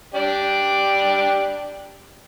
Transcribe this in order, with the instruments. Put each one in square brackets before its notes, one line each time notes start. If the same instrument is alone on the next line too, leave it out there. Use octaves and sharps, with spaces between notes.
[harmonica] D4 G4 D5